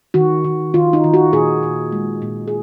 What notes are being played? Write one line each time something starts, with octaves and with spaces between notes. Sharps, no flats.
D#3 F#4
D#3
D#3 F4
D#4
D#3
F#4
A#2 G#4
A#2
G#3
A#2
G#4